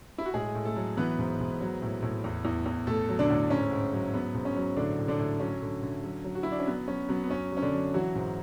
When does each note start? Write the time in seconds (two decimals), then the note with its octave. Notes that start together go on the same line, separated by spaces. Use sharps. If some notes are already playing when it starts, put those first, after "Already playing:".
0.18 E4
0.26 F#4
0.34 A2 G#3 G#4
0.55 A2
0.65 A3 A4
0.76 F#3
0.97 E3 B3 B4
1.18 G#2
1.40 G#2
1.61 F#3
1.82 A2
2.02 A2
2.24 E2
2.45 E2
2.66 E2
2.87 A2 A3 A4
3.09 F#3
3.19 D3 D4
3.30 A2
3.50 G#2 C#4
3.71 G#2
3.93 F#3
4.14 F#3 B3
4.34 G#2
4.45 C#4
4.56 F#3
4.77 A2 D3 D4
4.98 A2
5.08 D3 D4
5.19 A2
5.40 F#3 C#4
5.62 D3
5.83 D3
6.04 F#3
6.24 F#3
6.35 F#4
6.43 E4
6.46 F#3
6.52 D4
6.59 C#4
6.67 F#3 B3
6.88 F#3 C#4
7.09 F#3 B3
7.24 B3
7.30 F#2 C#4
7.52 F#3 C#4
7.62 D3 D4
7.73 F#3
7.94 E3 F#3 F#4
8.15 G#2